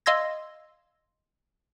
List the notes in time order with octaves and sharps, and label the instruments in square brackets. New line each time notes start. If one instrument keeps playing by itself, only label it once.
[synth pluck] D#5 F5 C6 E6 G#6 A#6